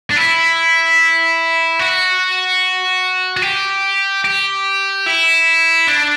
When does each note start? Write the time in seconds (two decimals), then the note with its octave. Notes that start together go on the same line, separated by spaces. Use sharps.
0.10 D4
0.17 E4
1.79 F#4
3.37 F#4
3.42 G4
4.24 G4
5.06 E4
5.87 D4